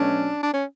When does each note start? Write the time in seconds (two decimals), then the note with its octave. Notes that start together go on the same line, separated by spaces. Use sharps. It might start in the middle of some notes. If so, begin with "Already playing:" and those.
Already playing: B2 F#3 A3 C#4 D4
0.43 D4
0.53 C#4